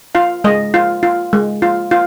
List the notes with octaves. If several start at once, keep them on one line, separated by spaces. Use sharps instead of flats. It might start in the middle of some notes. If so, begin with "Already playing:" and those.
F4 F5
G#3 D#5
F4
F4
G#3
F4
F4